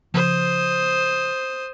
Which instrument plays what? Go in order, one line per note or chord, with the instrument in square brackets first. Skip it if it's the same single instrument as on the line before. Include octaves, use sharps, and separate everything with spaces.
[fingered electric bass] C#3 F3 [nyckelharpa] C5 D#6